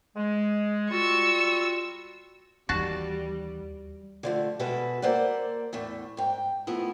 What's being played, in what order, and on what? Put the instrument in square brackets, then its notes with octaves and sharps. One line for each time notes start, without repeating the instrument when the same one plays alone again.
[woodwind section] G#3
[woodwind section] G3 F4 F#4 [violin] C#6 E6
[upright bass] D#2 E3 [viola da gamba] G3 [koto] F#4 A5
[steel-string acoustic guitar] D3 F3 A3
B2 G#3 F#4 A4 B4 E5
A#3 A4 C5 D5 F#5
E2 A2 A3
G#2 G5
F3 A3 B3 E4